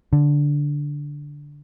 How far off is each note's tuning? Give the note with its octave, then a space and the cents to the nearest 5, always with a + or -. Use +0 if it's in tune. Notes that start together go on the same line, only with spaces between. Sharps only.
D3 -10